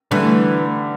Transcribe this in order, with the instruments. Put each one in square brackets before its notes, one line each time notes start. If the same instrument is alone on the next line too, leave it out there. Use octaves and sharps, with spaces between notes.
[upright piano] D3 G3 [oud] E3 A3